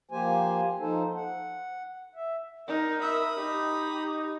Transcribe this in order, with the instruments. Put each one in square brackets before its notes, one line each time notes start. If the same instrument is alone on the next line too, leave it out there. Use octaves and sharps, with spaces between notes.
[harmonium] F3 A#3 G4 C5 G#5
F3 D#4 A4 C5
F#5
E5
[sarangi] D#4 [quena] A#4
[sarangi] E5 [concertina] B5 D#6
[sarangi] D#4 [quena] G4